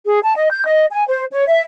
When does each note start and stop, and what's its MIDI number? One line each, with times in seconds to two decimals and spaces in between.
0.04 0.19 68
0.22 0.32 81
0.35 0.50 75
0.51 0.64 91
0.65 0.85 75
0.90 1.04 80
1.07 1.23 72
1.30 1.43 73
1.48 1.62 76